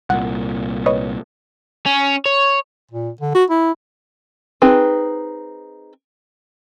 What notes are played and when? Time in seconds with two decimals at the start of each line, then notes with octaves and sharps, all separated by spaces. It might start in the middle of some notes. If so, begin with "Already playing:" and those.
0.10 C2 A#2 F#5
0.86 B4 C#5 D#5
1.86 C#4
2.26 C#5
2.91 A#2
3.21 D3
3.35 F#4
3.50 E4
4.62 C4 D#4 G#4 B4